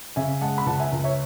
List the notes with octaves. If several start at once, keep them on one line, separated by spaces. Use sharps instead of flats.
C#3 E5 G#5
G#3 F#5 A5
B5
C#2 F#5 A5
E5 G#5
C#2
C#5 E5